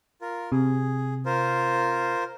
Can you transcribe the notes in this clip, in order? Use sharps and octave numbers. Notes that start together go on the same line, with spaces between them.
F4 A#4
C3 G#4
F4 A#4 C5